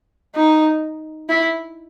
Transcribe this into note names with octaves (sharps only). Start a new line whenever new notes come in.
D#4
E4